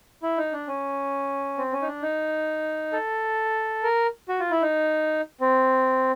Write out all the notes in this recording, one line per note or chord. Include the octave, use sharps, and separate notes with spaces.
E4
D#4
D4
C#4
C4
C#4
D#4
D4
D#4
A4
A#4
F#4
F4
E4
D#4
C4